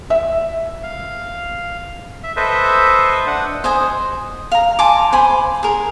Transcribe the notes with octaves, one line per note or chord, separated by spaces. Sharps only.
E5
F5
E5
A4 B4 C5 D#5 E5
D4 F#5
C5 D#5 G#5
F5 A#5
G#5 A5 C6 D6
C5 G#5 B5 C6
G#4 A#4